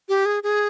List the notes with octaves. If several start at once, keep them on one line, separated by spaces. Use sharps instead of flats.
G4
G#4
G#4